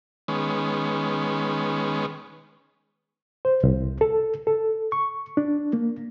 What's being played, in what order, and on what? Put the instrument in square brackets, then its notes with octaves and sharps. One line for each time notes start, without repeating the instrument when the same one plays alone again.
[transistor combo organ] D#3 G#3 B3 C#4
[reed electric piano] C5
C2
A4
A4
C#6
D4
A#3